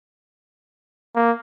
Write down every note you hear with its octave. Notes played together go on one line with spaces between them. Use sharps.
A#3